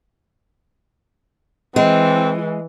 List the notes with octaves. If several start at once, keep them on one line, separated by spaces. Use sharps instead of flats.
E3 G#3 C4